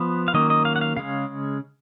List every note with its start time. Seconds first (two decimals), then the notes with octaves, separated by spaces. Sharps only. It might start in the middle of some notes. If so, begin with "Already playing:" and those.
Already playing: F3 B3 B4
0.28 F5
0.34 D#3 F#3 A#3 C#4 D#5
0.50 D#5
0.65 F5
0.76 F#5
0.81 F5
0.97 C#3 G#3 C#4 F5